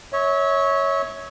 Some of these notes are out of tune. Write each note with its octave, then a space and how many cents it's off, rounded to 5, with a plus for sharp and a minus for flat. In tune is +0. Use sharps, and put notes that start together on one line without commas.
C#5 +0 E5 -35